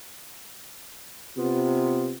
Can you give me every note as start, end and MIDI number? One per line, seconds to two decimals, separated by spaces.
1.37 2.12 48
1.37 2.13 59
1.37 2.13 65